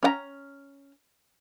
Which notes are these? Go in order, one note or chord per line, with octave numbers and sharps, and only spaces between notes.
C#4 F#5 A#5